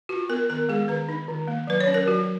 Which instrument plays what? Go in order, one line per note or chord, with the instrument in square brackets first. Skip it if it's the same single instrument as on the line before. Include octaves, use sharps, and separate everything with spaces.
[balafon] F4 F#4
B3 A#4
D#3 A#4
G#3 G#4
D#3 B4
D#4
D#3
A#3
F#3 B4
C#5
C#4
A#4
F#3 F#4